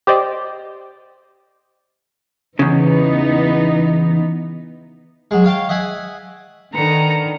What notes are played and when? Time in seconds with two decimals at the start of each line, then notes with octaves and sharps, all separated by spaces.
0.07 G4 C5 D5 D#5
2.59 E2 C#3 E3 B3 D#4
5.31 F#3 G#3
5.44 C#5 F5 G5 A5
5.69 D#5 E5 F#5 G#5
6.75 D3 D#3 B4 A#5 C#7